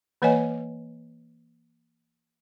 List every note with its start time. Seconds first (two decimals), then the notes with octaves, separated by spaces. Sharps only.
0.22 E3 A#3 B4 C#5 D#5 G#5